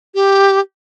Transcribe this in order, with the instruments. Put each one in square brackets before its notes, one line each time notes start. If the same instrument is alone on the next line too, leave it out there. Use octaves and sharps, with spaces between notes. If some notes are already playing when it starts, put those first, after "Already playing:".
[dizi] G4